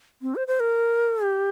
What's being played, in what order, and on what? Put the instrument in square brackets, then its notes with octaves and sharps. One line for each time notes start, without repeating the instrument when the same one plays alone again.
[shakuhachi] C4
C5
C5
A#4
G4